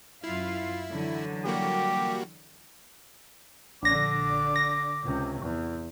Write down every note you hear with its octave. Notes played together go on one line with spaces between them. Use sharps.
F#2 E4 F4 F5
D3 E3 F#3
G3 A#3 F#4 G4
A#1 D3 D4 D6 A#6
A#6
C#2 C3
E2